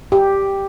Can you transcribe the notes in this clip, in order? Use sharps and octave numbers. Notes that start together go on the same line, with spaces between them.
G4